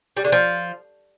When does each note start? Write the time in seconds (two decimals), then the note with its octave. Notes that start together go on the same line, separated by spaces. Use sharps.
0.17 G3
0.24 D3
0.32 F3